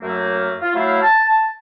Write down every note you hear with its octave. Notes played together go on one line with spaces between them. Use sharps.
F#2 F#3 A3 A#3
F4
F#3 A3 E4 F5
A5